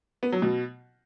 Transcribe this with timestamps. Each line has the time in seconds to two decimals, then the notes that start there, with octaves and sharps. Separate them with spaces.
0.23 B3
0.32 F#3
0.42 B2